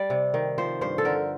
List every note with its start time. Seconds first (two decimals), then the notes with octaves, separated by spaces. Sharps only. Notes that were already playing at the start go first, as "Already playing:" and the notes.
Already playing: G3 D5
0.10 C3
0.34 D#3
0.58 F3 C5
0.81 G2 C5
0.98 A4
1.05 D3 A#4